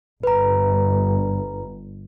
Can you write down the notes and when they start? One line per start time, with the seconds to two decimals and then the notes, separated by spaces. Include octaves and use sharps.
0.23 G1 B4 A#5